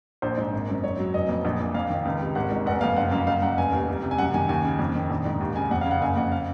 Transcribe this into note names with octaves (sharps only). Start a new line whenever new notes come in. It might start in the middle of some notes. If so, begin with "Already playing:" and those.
A#1 C5
G#2
G#1
F#2
G#2 C#5
F#3
F1 D#5
F2
A#1
A#2
F2 F5
D#3
C#2
C3
G#1 F#5
G#2
F1 F#5
F2 F5
F#1 F#5
F#2 F5
F#1 F5
F#2 F#5
F1 G#5
D#2
C2
C3
G#5
F#2 F#5
D#3 G#5
D#2 G#5
C#3
F2
D#3
A#1
G#2
D#2
C#3 G#5
F2 F#5
F5
C#3
F#5
F#1 G#5
F2 F#5
F5